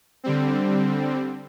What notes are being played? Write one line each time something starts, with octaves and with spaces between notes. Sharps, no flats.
D3 G3 C4